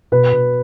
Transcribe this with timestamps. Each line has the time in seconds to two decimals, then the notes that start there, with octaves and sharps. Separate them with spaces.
0.12 B2 B4
0.32 B2